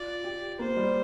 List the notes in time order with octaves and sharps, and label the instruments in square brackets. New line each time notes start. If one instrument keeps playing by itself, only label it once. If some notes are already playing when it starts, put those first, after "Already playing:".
Already playing: [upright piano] F4 [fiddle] D5
[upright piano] G4
[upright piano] A#3 [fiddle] C5
[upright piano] G3